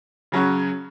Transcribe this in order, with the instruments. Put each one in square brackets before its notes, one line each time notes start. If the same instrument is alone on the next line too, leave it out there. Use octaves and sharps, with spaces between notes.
[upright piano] C#3 F#3 C#4 F#4